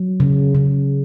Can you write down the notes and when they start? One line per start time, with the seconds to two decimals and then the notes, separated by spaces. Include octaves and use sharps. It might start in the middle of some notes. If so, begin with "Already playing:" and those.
Already playing: F#3
0.20 C#3
0.55 C#3